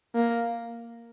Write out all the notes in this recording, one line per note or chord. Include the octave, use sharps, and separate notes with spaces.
A#3